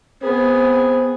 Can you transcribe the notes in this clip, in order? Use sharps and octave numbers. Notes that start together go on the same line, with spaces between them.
B3 C4 G#4